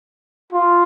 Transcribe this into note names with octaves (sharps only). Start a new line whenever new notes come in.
F4